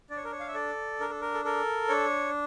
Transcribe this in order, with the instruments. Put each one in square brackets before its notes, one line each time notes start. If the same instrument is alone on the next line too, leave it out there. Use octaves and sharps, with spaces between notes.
[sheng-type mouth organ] D4 D5
C#5
A#4
C#5
F5
E5
A4 D5
D4 A#4
A4
A#4
A4
A4 A#4
D4 C#5